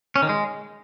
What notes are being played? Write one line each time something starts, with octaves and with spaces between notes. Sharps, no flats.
C#4
D#3
G#3